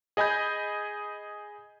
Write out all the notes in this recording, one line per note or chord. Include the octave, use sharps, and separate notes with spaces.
G#4 D#5 G#5 B5 G6